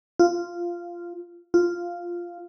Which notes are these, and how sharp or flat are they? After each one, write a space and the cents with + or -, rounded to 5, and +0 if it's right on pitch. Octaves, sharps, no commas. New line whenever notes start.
F4 -10
F4 -5